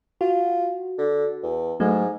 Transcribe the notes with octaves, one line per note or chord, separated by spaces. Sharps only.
F4 F#4
D3
E2
G#2 F#3 A3